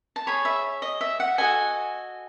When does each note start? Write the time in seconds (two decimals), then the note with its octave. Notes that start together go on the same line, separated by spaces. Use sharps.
0.16 A5
0.27 G#4 C#5 B5
0.45 E5
0.82 D#5
1.01 E5
1.20 F#5
1.38 F#4 A4 D#5 G#5